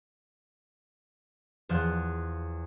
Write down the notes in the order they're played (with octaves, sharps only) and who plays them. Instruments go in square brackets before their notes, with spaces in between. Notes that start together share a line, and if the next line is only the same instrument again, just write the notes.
[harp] E2 F3 F#6